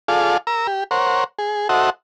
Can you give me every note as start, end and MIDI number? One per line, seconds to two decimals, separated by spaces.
0.08 0.37 65
0.08 0.37 68
0.08 0.37 69
0.08 0.37 74
0.08 0.37 77
0.47 0.67 70
0.47 0.67 82
0.47 0.67 88
0.67 0.84 67
0.91 1.24 70
0.91 1.24 72
0.91 1.24 73
0.91 1.24 78
1.39 1.68 68
1.69 1.90 66
1.69 1.90 69
1.69 1.90 72
1.69 1.90 75
1.69 1.90 76
1.69 1.90 78